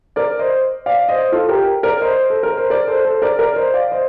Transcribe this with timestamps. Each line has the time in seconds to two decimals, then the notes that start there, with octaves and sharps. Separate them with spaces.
0.16 A#4 D5
0.39 C5 D#5
0.86 D5 F5
1.09 C5 D#5
1.32 F4 A4
1.49 G4 A#4
1.83 A#4 D5
2.01 C5 D#5
2.30 A4
2.43 A#4
2.57 C5
2.70 A#4 D5
2.88 A4 C5
3.05 A4 C5
3.22 A#4 D5
3.39 A#4 D5
3.56 C5 D#5
3.74 D5 F5
3.91 C5 D#5